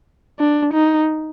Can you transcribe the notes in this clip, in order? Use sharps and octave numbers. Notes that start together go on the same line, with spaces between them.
D4
D#4